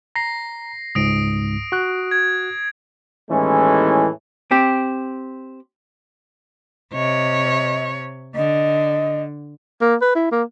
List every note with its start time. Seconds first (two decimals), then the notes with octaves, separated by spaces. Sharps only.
0.16 A#5 A#6 C7
0.95 C#2 G#2 D#6 A#6 D7
1.72 F#4 F#6
2.11 G#6
3.30 D#2 A2 E3 G#3 A3 C#4
4.51 C4 G4
6.93 C3 C#5 D#5
8.35 D3 D#5
9.81 A#3
10.02 B4
10.15 E4
10.32 A#3